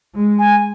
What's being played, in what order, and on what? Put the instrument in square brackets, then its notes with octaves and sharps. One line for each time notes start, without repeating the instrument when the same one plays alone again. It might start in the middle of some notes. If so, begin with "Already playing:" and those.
[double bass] G#3
[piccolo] G#5